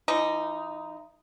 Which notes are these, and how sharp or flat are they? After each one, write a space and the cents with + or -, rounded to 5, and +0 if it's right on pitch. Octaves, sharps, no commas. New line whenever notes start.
E3 +40 D#4 +0